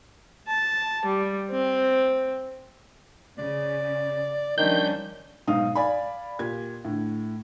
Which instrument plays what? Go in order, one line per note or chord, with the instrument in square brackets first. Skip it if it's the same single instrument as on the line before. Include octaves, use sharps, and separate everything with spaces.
[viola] A5
G3
C4
[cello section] C#3 [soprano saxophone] D5
[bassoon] D#3 [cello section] F3 G3 C#4 [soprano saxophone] D4 [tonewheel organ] G6
[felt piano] B1 G#2 D#4 F5 D#6
D5 F5 G#5 B5
A#2 G4 G#6
A2 D3